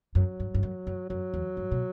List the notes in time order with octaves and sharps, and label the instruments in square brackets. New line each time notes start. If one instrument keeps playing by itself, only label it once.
[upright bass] F#2 [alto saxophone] F#3
[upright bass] G2
G2
F#2
F#2
[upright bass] F#2 [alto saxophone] F#3
[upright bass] E2
G2
B2